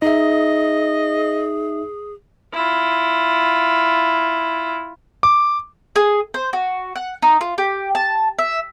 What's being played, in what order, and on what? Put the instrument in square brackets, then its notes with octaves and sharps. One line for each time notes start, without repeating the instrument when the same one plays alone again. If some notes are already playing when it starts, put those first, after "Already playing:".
[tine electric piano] D#4 E5 [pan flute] G#4 [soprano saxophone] D#5
[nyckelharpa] E4 F4
[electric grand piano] D6
[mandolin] G#4
C5
F#4
F#5
D#4
F4
G4
A5
E5